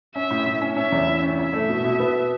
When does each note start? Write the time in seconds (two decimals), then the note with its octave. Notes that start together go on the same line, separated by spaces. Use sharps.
0.15 C#4 E5
0.31 A2
0.46 A2
0.62 C#4
0.76 C#4 E5
0.92 E2
1.07 E4
1.22 C#4
1.38 E4 E5
1.53 A3
1.69 B2
1.84 B2
2.00 B3